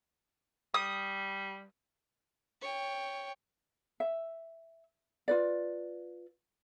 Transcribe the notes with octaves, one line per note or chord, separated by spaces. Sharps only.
G3 D#6
C#5 G5
E5
F4 B4 D5